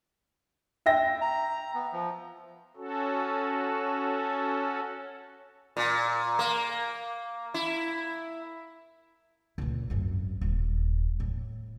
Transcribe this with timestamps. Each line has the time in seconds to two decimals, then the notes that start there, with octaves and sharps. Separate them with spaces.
0.86 E5 G5 A#6
1.21 A#5
1.74 B3
1.93 F3
2.76 C#4 F#4 A4
5.77 A#2
6.39 A#3
7.54 E4
9.58 C#2 A#2
9.90 G#1 F#2
10.41 D#1
11.20 A2